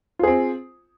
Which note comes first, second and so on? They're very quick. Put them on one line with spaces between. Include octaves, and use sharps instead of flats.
F4 G#4 C4